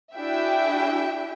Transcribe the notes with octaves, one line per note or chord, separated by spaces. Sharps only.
D4 E4 F#4 G#4 E5 G5